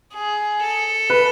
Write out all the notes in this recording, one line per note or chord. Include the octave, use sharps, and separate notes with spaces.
G#4
A4
B4